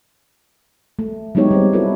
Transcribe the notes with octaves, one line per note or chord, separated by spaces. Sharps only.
A3
F#3 G#3 B3 D#4 G4 C#5
G3 C4 C5
B3 E4 F#4 A4 B4